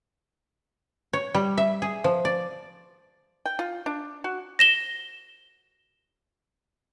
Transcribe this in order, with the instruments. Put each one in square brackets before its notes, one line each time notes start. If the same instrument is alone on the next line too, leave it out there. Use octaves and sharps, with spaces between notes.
[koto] C#5
G3
E5
G#4
F3
D5
[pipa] G5
F4
D4
F#4
[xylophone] A#6 E7 G7